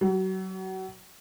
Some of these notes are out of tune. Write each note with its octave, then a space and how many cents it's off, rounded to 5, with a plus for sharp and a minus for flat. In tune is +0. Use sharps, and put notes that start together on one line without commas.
F#3 +30